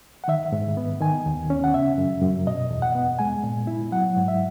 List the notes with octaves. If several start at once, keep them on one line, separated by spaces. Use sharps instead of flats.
F#5
D#3 E5
G#2
B3
D#3 G#5
D#2
C#4
F#5
C#3 E5
F#2
F#2
B2 D#5
E2
F#5
B3
G#3 G#5
A#2
E4
F#3 F#5
G#2
E5